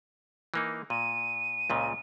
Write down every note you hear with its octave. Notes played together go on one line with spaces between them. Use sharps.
E3 A#3 D#4
A#2 D#7
C#2 A#2 C#3